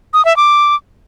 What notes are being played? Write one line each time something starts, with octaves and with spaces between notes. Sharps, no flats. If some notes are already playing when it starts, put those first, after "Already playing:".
D#6
E5
D6